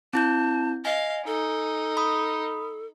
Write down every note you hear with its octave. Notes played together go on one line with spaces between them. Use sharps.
C4 E4 A5 G6
D#5 F5 G#5
D#4 A4
B5 D#6